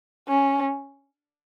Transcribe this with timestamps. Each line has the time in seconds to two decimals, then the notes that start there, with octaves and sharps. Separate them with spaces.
0.28 C#4